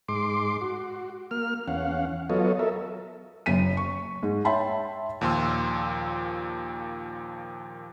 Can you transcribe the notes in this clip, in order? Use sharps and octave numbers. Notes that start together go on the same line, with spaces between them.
G#2 C6 D6
F#4
A#3 F6
E2 C#4 F5 F#5
F#3 B3 F4 A4 C#5 D#5
A4 A#4 E5
F#1 F#2 B6 D#7
C#6
G#2
C#5 E5 G5 A5 B5 C6
D#2 A#2 F3 C6 E6